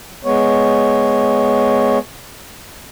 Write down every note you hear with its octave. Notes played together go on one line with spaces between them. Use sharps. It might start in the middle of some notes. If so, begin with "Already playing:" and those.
G#3 B3 C#5